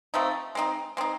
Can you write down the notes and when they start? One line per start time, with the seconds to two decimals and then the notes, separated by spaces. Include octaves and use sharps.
0.14 F3 A3 C4 D#4
0.55 G#3 C4 D#4
0.97 G#3 C4 D#4